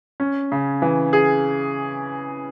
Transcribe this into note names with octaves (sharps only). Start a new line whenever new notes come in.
C#4
C#3
E3
G#4